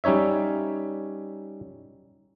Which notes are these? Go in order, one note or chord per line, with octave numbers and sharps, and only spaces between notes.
G3 C#4 D#4 C#5 E5